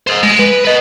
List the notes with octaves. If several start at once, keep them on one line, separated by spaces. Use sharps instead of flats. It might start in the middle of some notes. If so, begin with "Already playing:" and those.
C5 D#5
G#3
B4
B4 D#5